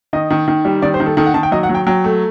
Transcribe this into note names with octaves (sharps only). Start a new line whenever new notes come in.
D#3 D#5
D#3
D#3
G3
D#3 D5
C5
D#3
A4
D#3 A4
F#5
D#3 A5
G5
F#3 D#5
F#5
F#3
G5
F#3 G5
A3